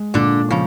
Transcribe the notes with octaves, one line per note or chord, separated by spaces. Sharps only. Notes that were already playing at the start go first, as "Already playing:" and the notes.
Already playing: G#3
A#2 D3 D4
C#3 F3 C#4